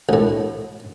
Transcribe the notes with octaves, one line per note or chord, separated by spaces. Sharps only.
D2 A2